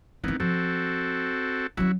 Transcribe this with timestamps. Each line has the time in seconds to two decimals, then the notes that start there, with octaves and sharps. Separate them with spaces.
0.24 D#3 E3 B3 C4 D#4
0.40 F3 C4 F#4 A4
1.77 F#3 C#4 E4 F#4